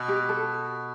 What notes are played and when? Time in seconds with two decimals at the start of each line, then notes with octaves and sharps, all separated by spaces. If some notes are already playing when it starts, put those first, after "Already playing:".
Already playing: B2
0.08 G4
0.29 A4